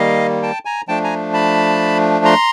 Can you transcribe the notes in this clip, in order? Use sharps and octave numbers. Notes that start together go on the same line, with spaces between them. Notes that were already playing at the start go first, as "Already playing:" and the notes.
Already playing: D#3 G3 A#3 D#5 F5
G5 A5
G#5 A#5
F3 A3 D4 G5 A5
G#5 A#5
A5 B5
A#5 C6